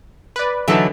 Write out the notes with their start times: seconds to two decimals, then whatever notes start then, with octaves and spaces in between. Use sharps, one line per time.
0.36 B4 D5
0.68 D3 E3 F#3 D#4 A4 E5